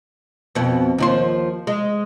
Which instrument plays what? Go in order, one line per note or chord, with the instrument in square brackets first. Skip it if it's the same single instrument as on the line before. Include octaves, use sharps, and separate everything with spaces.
[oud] F2 B2
D#2 F3 C5
G#3